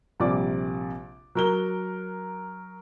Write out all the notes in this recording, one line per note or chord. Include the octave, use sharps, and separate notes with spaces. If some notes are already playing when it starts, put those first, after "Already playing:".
A#1 C3 G3 D5 D6
F#3 A#4 G7